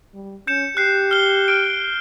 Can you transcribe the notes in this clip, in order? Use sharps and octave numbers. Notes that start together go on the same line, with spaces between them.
G3
C#4 G6 C#7 E7
G4 F#6 C7
F6 G7
F6 D7